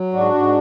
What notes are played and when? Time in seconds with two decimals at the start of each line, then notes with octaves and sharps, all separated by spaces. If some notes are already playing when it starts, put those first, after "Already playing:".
Already playing: F#3
0.13 G#2 D4 F#4
0.34 G#2